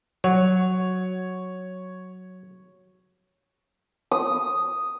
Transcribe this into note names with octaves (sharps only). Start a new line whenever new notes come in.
F#3 C#5 F#5
D#6